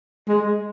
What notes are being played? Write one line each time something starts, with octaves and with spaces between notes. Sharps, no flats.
G#3